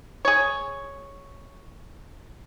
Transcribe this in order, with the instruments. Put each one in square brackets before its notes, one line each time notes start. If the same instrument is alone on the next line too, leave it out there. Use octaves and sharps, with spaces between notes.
[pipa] G#4 C#5